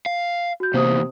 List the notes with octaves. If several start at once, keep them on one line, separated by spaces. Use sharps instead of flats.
F5
F#4 G6
E2 C3 A#3 C5 D#6